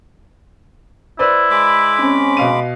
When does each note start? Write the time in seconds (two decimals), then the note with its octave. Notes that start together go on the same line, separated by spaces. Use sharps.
1.19 E4 B4 C5 D5
1.50 G#3 B5 D6
1.99 C4 C#4
2.37 B2 F5 D#7